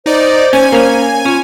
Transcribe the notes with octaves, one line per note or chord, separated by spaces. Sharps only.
D#4 C5 D5
C#4 G#5
A#3 C#4
C#4 F4